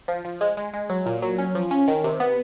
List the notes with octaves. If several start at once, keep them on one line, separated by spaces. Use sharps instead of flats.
F3
F3
G#3
G#3
G#3
F#3
A#2
F#3
C#4
F3
C#4
D#3
C3
B3